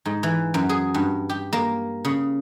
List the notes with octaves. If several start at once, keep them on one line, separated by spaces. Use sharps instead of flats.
G#2
E3
F#2
G#4
G2
G4
A#3
C#3